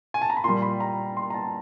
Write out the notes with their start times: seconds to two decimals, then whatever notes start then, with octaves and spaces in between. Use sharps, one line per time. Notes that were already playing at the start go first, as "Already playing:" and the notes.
0.14 G#5
0.22 A5
0.30 A#5
0.37 B5
0.44 A#2 G3 C6
0.62 B5
0.80 A#5
1.17 C6
1.30 A#5
1.34 A5